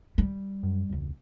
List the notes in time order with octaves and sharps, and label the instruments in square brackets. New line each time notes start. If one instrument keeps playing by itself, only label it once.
[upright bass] G3
[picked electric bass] F#2
E1 C#2